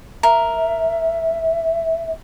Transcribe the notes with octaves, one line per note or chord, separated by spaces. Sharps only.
A#4 E5